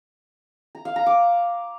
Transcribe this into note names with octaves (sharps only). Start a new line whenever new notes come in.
A#5
F5
A#5
D6